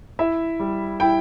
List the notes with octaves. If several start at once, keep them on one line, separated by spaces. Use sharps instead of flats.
E4 E5
G3
E4 G5